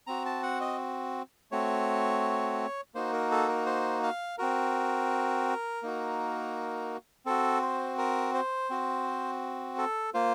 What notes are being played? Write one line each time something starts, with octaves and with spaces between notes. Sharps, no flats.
C4 F#4 A#5
A5
F#5
D#5
A3 C4 F#4 C#5
A#3 D#4 F#4 C5
A#4
A4
A#4
C5
F5
C4 F#4 A#4
A#3 D#4 F#4
C4 F#4 A4
C5
A#4
C5
C4 F#4
A4
A#3 F4 C5